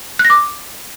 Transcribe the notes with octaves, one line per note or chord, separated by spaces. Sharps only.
F#6
A#6
D6